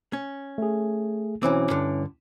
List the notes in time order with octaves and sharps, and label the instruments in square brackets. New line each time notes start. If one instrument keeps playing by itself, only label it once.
[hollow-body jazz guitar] C#4
[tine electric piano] A3 G#4
[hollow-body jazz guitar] B1 E3 C4 [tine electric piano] C#4 E4 D6
[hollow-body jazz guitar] G2 D3